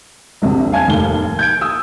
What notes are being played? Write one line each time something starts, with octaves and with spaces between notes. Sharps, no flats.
E1 A#1 C3
F5 G#5 A5 G#6
F1 D#2 A2 A#3 G7
G6 G#6 D7
D#6 E6